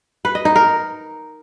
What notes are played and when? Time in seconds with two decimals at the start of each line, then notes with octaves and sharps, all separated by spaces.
0.25 B4
0.35 D#5
0.45 D#4
0.56 A#4